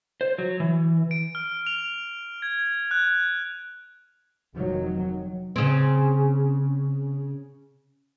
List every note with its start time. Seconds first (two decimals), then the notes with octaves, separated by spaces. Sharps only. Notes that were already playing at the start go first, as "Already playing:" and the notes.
0.21 C5
0.38 F#3
0.60 E3
1.11 D7
1.35 F6
1.66 F7
2.42 G#6
2.91 F#6
4.56 F1 D#3 F#3
5.56 C#3 C4